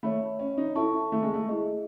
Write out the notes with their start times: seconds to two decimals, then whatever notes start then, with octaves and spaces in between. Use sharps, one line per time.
0.03 A3 C#5 E5 B5
0.39 C#4
0.58 D#4
0.75 E4 A4 E5 A5 C#6
1.12 A3
1.23 G#3
1.34 A3
1.48 E4 G#4 D#5